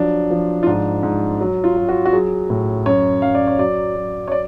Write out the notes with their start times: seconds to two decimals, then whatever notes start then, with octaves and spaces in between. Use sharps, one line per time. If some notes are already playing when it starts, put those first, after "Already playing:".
Already playing: F3 F#3 D4
0.31 F3
0.63 F4
0.67 G#2 D4
1.03 G#2
1.41 F#3
1.64 F4
1.77 F#3
1.89 F#4
2.06 F#4
2.13 F#3 G#4
2.50 A2
2.86 F#2 C#5
3.22 F#2 F5
3.35 D5
3.48 C#5
3.59 F#3 D5
3.96 F#3
4.28 C#5
4.32 D5